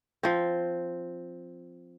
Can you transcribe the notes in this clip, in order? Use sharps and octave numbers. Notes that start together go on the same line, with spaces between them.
F3 C4